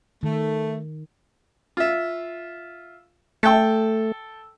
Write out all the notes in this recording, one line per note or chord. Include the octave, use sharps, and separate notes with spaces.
D#3 A3
F4 E5
A3 A4 G5